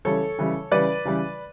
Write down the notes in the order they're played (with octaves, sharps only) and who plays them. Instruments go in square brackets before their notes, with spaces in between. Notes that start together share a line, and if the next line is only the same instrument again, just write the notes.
[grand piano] C#3 E3 G3 A4 C#5
C#3 E3 G3
C#3 E3 G3 B4 D5
C#3 E3 G3